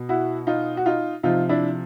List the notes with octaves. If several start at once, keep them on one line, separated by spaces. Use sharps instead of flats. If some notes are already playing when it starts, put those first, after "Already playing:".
Already playing: B2
E4 F#4
D#4 F4
F#4
D#4 F4
C3 F3 D#4 F4
D4 E4